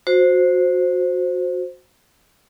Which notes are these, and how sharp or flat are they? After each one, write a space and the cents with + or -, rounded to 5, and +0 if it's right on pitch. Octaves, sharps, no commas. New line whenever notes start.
F#4 -20 C5 +0